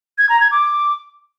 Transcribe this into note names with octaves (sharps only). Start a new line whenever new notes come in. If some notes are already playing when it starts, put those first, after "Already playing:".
G#6
A#5
G#6
D6